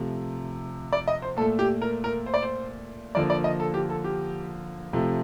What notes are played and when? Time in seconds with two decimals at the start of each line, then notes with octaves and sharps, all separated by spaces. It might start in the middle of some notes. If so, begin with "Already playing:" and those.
Already playing: C3 F3 A3
0.93 D5
1.08 D#5
1.22 C5
1.37 A#2 A4
1.41 A3
1.59 G4
1.82 A#4
2.04 A#4
2.26 C5
2.34 D5
2.42 C5
3.15 D3 F3 A#3 D5
3.30 D5
3.44 D#5
3.60 A4
3.74 G4
3.90 A4
4.04 G4
4.93 C3 F3 A3